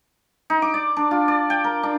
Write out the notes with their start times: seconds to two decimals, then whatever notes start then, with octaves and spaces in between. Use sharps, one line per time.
0.50 D#4
0.62 D6
0.74 D5
0.97 D4
1.11 F4
1.28 D5
1.50 G5
1.64 A#4
1.83 D4